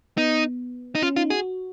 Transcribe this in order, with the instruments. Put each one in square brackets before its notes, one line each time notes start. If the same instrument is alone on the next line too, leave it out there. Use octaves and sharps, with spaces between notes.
[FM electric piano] B3 [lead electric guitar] D#4
[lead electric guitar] D#4
[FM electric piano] C#4 [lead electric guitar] F4
[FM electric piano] D#4 [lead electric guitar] F4
[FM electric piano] F#4 [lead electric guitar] G#4